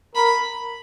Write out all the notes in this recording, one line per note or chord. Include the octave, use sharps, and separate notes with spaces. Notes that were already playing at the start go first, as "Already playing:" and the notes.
A#4 B5